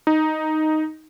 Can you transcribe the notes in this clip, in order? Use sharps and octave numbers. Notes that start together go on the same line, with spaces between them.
D#4